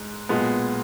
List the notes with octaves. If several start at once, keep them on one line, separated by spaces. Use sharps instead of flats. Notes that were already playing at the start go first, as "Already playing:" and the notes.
Already playing: G#2 G#3
B1 A#2 G#3 B3